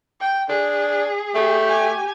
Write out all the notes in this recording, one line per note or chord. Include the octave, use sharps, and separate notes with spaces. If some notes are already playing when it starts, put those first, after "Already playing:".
G5
D4 G#4
A3 G4
G#5